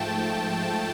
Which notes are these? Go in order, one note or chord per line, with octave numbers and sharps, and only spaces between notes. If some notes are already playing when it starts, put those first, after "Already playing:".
Already playing: G#2 F3 A3 G5 A5